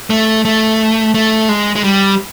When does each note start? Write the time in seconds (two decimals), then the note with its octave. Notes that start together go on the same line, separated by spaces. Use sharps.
0.10 A3
0.45 A3
1.14 A3
1.49 G#3
1.76 G#3
1.84 G3